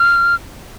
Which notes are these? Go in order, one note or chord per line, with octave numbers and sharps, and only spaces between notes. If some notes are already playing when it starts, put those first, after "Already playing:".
Already playing: F6